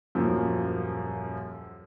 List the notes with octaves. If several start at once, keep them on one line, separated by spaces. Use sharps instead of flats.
D#1 F#2 F3 A#3